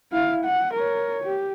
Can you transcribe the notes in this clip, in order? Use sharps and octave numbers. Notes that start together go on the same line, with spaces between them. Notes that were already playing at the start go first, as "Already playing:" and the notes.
E4 F5
F#5
A#4 C#5
G4